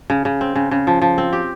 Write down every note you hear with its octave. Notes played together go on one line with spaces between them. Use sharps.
C#3
C#3
C4
C#3
C#3
F3
F3
C4
G4